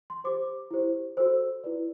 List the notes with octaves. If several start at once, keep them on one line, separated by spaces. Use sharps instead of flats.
C6
G4 C5 D6
E4 G4 C5
F#4 A4 C5 E6
E4 B4 D5